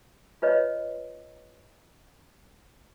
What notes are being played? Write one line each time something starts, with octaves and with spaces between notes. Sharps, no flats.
F4 B4 C#5 D#5